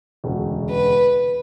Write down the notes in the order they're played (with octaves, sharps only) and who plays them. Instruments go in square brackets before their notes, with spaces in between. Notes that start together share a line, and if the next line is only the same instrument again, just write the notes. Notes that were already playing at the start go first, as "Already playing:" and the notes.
[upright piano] E1 D2 C#3
[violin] B4